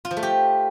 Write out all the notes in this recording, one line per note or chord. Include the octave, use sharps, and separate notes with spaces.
F4
F3
A3
G4